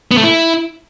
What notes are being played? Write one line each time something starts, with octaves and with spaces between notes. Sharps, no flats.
B3
A3
E4